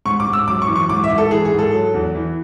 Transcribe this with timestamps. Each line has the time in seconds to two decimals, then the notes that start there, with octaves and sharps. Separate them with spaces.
0.06 G#2 C#6
0.20 D6
0.27 G#2
0.33 E6
0.47 F#2 D6
0.62 C#6
0.68 E3
0.76 C#6
0.89 G#2 D6
1.04 E5
1.10 G#2
1.18 A4
1.31 E3 G#4
1.45 G#4
1.52 G#2
1.59 A4
1.73 F#3
1.94 E2
2.15 E3